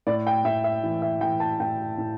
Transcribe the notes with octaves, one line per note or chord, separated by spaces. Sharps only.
A2 D5
G5
A2 E5
E5
E3
E5
E3 G5
A5
A2 G5
A2